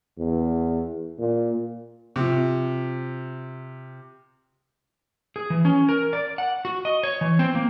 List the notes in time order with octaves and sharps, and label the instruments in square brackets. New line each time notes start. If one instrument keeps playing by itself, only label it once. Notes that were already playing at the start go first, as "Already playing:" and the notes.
[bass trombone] E2
A#2
[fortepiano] C3 F3
[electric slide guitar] G#4
E3
C#4
A#4
D5
F#5
F#4
D#5
C#5
E3
C4
A#3